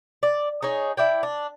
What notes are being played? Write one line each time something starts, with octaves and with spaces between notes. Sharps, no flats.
D5
D#4 G#4 C#5
E4 D5 G5
D4